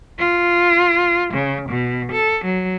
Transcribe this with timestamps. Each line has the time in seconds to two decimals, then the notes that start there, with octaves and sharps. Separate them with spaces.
0.19 F4
1.34 C#3
1.70 B2
2.12 A4
2.45 F#3